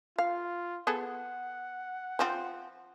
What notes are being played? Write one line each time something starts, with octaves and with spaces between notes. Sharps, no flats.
F4 F5
B3 G#4 A4 F#5
F3 C4 F4